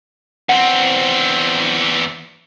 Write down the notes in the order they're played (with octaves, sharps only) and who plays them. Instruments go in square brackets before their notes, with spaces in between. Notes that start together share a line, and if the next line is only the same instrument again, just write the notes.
[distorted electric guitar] E2 C4 [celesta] F#5